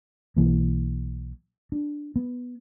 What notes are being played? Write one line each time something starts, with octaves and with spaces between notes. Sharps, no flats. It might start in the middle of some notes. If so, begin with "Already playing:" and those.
B1 E3 A#3
D4
B3